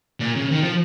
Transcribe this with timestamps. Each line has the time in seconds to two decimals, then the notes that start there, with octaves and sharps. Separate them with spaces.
0.20 A#2
0.35 C#3
0.51 D#3
0.62 F3